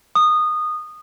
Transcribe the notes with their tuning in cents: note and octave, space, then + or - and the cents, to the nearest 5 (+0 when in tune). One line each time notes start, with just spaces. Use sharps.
D#6 -20